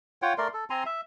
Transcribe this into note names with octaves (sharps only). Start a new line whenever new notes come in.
F4 C#5 F#5 G5
A3 A#4 D5 C6
A4
C4 G#5 A#5 C6
E5